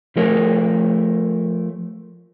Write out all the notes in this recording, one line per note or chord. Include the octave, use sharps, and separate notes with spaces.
F3 A3 A#4 C#5